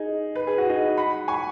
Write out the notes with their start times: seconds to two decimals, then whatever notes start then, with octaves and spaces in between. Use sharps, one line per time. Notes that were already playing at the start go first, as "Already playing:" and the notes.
Already playing: D#4 G#4
0.35 B4
0.47 G#4
0.58 F#4
0.69 D#4 G#4
0.97 F#5 B5
1.28 G#5 C#6